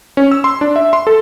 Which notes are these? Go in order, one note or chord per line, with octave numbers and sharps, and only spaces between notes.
C#4
E6
C6
D4
E5
C6
A4